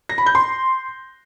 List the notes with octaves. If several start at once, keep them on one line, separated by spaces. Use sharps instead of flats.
A#6
B5
G6
C6